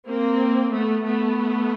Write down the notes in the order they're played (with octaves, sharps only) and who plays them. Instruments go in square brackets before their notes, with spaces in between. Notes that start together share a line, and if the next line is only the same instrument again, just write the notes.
[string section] A#3 C4
A3 B3
A3 B3